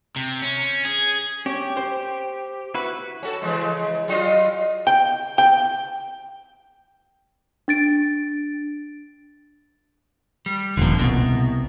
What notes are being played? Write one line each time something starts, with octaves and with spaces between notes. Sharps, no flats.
C3
C#4
G#4
C#4 G4
C5
E4 F#4 B4
C#4 F#4 A4
C#3 E3 G#3
F#3 F4 D#5
G5
G5
D4 A6 D7
G3
D#1 A#2 D3 F3
C2 B2